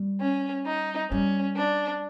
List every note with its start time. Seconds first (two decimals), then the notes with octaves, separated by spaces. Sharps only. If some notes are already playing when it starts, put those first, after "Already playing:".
Already playing: G3
0.21 C#4
0.66 D#4
1.11 G3 C#4
1.57 D4